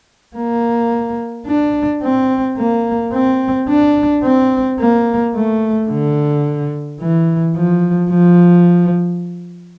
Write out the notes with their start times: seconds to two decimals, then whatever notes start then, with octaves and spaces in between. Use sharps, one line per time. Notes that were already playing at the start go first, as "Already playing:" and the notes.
0.36 A#3
1.47 D4
2.03 C4
2.58 A#3
3.13 C4
3.69 D4
4.23 C4
4.79 A#3
5.35 A3
5.89 D3
7.01 E3
7.56 F3
8.10 F3